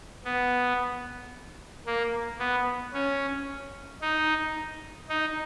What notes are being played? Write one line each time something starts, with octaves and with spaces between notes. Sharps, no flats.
B3
A#3
B3
C#4
D#4
D#4